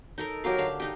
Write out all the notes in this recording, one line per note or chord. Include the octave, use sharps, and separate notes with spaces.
D#4 A4 A#4
F#3 G4 A#4 F5
D3 F5 A5
D#4 G4